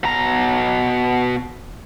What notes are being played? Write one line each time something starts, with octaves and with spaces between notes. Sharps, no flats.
B2 A#5